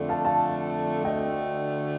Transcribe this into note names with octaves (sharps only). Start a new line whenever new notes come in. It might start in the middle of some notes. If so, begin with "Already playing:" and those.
Already playing: F2 D3 A3
F5 A5
F5 A5
D2 D3 A3 D#5 G5